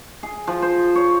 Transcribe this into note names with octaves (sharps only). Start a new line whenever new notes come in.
G#4
F3
C5
C#5